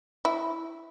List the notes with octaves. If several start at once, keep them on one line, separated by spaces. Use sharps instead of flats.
E4